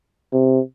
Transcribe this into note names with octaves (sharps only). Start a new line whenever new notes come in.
C3